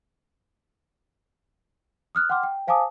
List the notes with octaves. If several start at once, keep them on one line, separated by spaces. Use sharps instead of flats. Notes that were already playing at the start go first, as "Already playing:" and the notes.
D#6 F6 F#6
F#5 G5 C6 D6 F6
G5
C5 F5 G#5 A5 D6 D#6